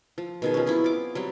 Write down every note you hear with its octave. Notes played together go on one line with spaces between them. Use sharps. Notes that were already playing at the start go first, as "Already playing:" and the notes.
F3
B2 D#3 G#4
F3 C#4
F#3 B3 C4 E4
F4 D6
F#3 G3 C4